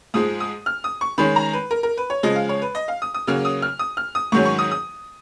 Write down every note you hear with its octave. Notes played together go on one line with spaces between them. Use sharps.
G#2 F3 G#3 D#6
D#6
F6
D#6
C#6
D#3 G#3 C#4 B5
A#5
B4
A#4
A#4
B4
C#5
C#3 F3 G#3 D#5
F5
C#5
B4
D#5
F5
D#6
D#6
C#3 F#3 A#3 C#4 F6
D#6
F6
D#6
F6
D#6
G#2 D#3 F#3 C#4 C#6
C#6
D#6
D#6